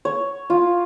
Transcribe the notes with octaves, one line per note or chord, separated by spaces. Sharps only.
C#5
F4